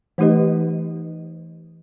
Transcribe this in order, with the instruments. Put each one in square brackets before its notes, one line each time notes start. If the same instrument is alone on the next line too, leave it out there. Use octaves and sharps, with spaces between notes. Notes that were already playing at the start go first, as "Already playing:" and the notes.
[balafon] E3 A3 D#4 G4 B4 D#5